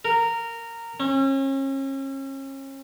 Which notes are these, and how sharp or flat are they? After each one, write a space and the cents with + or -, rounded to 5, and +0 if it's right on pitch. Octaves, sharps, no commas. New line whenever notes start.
A#4 -15
C#4 -35